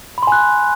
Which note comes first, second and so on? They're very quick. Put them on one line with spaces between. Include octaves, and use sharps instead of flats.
B5 C6 G#5 F#6